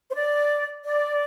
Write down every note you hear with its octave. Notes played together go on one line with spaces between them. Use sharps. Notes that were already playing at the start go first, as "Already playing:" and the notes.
C5
D5
D5